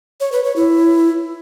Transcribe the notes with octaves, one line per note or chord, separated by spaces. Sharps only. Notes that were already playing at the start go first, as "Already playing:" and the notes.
C#5
B4
C#5
E4